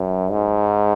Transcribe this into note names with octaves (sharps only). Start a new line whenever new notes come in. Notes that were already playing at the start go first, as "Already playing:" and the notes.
Already playing: F#2
G#2